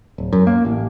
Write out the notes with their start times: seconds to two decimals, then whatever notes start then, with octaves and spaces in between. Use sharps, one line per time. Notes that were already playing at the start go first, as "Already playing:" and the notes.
0.18 D1
0.33 F#2
0.47 A#3
0.65 A1